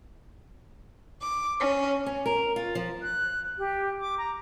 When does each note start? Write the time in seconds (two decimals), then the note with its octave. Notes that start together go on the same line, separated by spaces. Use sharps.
1.21 D6
1.59 C#4
2.06 C#4
2.26 A#4
2.56 F4
2.75 F3
3.02 F#6
3.58 G4
4.00 D6
4.18 A#5